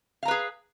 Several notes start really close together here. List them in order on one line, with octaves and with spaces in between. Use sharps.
F5 A#5 B4 G#4